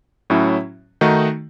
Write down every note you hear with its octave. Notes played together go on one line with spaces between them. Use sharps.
A2 F#3 C#4 E4
D#3 A3 D#4 F#4